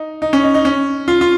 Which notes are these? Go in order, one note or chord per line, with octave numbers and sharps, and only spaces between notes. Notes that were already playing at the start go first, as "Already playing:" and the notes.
Already playing: D#4
D#4
C#4
D#4
D#4
C#4
F4
F4